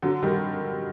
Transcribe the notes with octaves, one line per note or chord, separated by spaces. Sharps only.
D3 F#3
D#3 G3